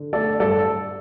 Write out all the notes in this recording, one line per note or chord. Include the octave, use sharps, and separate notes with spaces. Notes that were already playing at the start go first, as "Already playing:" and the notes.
Already playing: D3
A3 A4 D5
G2 A4 D5